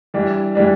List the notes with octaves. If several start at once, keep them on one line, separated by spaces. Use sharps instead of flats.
E3 G3 D4
E3 G3 D4